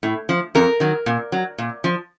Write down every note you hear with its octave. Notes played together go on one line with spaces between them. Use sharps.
A2
F3
F2 A#4
D#3 F#3
A#2
F#3
A#2
F3